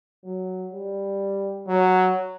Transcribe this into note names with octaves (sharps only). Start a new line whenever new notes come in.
F#3
G3
F#3